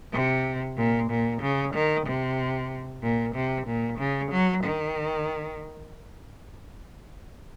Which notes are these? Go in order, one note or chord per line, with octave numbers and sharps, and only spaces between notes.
C3
A#2
A#2
C#3
D#3
C3
A#2
C3
A#2
C#3
F#3
D#3